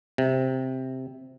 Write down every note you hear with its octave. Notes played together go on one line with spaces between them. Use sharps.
C3